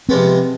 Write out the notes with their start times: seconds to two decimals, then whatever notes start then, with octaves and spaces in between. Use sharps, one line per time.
0.09 C3 F3 G#3 B3 C4